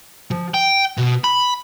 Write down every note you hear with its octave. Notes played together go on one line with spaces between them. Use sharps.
F3
G5
B2
B5